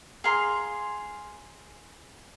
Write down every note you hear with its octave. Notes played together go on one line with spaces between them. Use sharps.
G#4 F5 A#5 C6